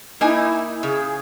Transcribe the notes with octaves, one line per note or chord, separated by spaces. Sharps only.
A#3 D#4 E4 G#5
C#3 G#4